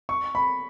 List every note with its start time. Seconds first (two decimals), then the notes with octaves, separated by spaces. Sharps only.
0.09 C#6
0.35 B5